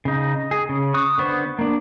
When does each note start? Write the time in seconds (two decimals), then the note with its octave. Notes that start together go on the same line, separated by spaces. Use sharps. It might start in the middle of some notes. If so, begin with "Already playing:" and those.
0.05 C#3 D#4
0.51 G#4
0.69 C#3
0.94 C#6 D#6 F#6
1.18 D3 B3 C5
1.59 A#3 D4